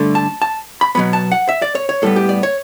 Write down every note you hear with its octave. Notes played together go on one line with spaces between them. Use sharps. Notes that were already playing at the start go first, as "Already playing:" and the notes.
Already playing: G2 D3 A3
A5
A5
B5
B2 F#3 B3 B5
A5
F#5
E5
D5
C#5
C#5
A2 G3 B3 A4
G4
D5
C#5